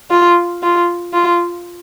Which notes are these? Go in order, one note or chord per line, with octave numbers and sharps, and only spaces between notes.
F4
F4
F4